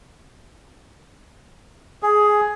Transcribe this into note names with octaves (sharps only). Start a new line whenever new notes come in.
G#4